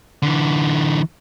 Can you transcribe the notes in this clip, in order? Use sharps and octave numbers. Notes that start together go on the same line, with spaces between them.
D3 E3